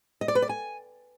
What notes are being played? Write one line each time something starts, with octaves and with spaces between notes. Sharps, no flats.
D#5
D5
B4
D5
G#5